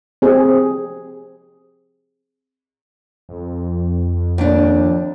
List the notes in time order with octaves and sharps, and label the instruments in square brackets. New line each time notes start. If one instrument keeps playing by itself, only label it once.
[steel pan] C4 G#4
[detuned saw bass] F2
[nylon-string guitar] D#2 D4